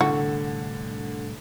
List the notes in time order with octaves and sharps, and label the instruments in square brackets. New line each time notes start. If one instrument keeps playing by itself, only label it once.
[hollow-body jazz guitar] C2 A2 A4 [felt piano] D3 [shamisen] F#4